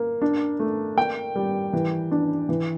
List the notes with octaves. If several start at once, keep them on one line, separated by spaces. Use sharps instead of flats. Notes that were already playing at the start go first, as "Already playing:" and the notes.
Already playing: A#3
D4
A3
A#3 G5
G3
E3
D4
E3